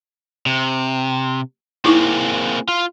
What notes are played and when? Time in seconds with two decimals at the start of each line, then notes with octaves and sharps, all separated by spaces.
0.46 C3
1.85 A#3 C4 D#4 E4 G#4 C#6
2.68 F4